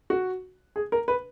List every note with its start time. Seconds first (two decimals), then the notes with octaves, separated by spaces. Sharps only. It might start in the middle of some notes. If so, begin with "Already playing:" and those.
0.10 F#4
0.76 G#4
0.92 A#4
1.08 B4